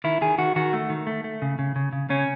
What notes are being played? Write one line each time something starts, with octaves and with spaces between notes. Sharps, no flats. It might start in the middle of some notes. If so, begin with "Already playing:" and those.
D#3 E4
D#3 G#4
D#3 F#4
D#3 F#4
A3
D#3
A3
A3
C#3
C#3
C#3
C#3
C#3 C#4